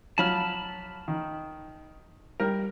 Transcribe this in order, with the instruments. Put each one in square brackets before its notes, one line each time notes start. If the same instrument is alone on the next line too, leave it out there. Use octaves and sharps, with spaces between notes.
[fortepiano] F3 F#3 [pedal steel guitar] A5 B5 F6
[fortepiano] D#3
G3 A#4